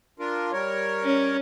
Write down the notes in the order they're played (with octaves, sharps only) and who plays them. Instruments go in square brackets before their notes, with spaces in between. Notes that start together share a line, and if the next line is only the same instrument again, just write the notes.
[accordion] D4 F4 A#4
G3 A#4 C#5
[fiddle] C#4